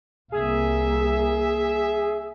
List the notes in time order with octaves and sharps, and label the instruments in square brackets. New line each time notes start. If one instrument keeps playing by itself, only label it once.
[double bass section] C2 A#3 [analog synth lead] G#4 [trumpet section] E5